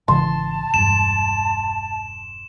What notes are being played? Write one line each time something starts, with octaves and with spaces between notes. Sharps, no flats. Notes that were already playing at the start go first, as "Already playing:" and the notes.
G#1 C#3 E3 A5 C6
E1 G2 E7